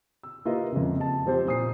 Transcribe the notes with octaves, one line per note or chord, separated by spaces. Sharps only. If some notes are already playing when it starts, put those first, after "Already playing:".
E6
A#3 F4 G4 B4 D#5 E5
F2 C#3
D#5 A5
F3 C4 G4 C5
A#2 D#6 C7